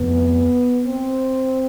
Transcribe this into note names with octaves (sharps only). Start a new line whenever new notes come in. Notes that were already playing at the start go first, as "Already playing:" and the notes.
Already playing: F1 F2 C3 F3 B3
C4